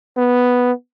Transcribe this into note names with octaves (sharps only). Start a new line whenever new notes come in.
B3